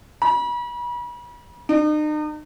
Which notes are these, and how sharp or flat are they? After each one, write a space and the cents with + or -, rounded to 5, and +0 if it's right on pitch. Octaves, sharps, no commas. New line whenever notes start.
B5 -40
D#4 -40